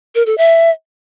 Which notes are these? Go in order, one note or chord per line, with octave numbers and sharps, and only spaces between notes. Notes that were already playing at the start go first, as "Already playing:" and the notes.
A#4
A4
E5